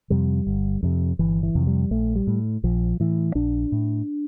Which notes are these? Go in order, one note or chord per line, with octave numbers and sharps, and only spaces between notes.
F2 C3 G3
G1
F2 C3
G1 E3
E3
F2 C3
G3
A#1 A3
G3
A2
A#1 F3
A2 E3
A#1 D4
A2